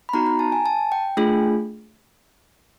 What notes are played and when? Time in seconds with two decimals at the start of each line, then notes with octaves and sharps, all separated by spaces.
0.09 B5
0.13 B3 D#4 F#4 A#5
0.26 A#5
0.39 A5
0.52 G#5
0.66 A5
0.92 G5
1.17 A3 D4 F4 G#4